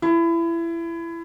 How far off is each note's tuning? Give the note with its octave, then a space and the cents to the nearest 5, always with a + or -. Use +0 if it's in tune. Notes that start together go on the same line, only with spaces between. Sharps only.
E4 +25